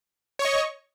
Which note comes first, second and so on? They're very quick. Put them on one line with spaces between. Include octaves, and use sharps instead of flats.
C#5 C#6 D#5